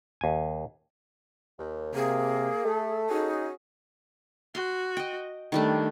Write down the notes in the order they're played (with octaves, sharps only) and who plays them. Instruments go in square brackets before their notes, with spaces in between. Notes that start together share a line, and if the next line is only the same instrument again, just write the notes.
[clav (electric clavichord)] D#2 G#5
[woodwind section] D#2
[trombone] C3 [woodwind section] A#3 [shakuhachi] G#4
[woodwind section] A3 [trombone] A4
[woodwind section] C#4 F#4 G#4 [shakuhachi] D#4
[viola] F#4 [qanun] C6
[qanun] D#5 G5
[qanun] D#3 G3 D4 [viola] A3